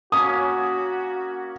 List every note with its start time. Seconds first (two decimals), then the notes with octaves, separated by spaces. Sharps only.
0.12 A#3 C#4 F#4 D#6